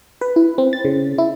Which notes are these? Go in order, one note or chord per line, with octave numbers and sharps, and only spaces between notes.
B4
E4
C4
A6
C#3
E4